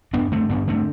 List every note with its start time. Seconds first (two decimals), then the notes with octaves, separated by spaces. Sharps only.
0.13 G2 B3 D4
0.32 D3 A3 C4
0.50 G2 B3 D4
0.67 D3 A3 C4